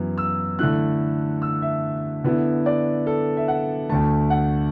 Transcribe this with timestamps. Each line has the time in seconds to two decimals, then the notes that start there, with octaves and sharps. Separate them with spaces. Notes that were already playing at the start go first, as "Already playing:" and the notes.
Already playing: F#2 E3 B3 E4
0.18 E6
0.59 D3 A3 E4 F#6
1.42 E6
1.62 E5
2.24 D3 B3 E4
2.66 D5
3.07 A4
3.37 E5
3.48 F#5
3.89 D2 D3 A3 A5
4.30 F#5